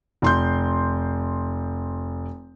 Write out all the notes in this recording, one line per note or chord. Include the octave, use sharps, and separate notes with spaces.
F1 C6 G6